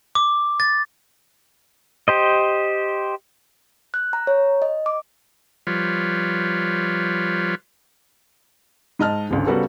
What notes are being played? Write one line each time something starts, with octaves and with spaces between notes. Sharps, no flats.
D6
A6
G4 C5 D#5
F#6
A#5
C#5
D#5
D6
F3 G3 F4 B4 C#5
G#2 D#5 A5 F6
G#1 C#2 D3
C#3 G3 B3 F#4 A4 A#4